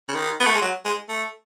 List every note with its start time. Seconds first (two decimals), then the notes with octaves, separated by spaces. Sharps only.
0.09 C#3
0.15 D#3
0.40 B3
0.47 A3
0.54 G#3
0.62 F#3
0.85 G#3
1.09 A3